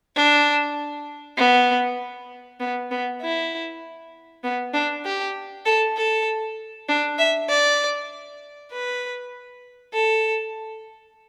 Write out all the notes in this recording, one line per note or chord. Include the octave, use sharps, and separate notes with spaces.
D4
B3
B3
B3
E4
B3
D4
G4
A4
A4
D4
E5
D5
B4
A4